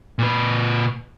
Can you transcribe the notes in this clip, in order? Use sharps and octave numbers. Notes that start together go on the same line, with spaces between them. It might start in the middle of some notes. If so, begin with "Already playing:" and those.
A#2 B4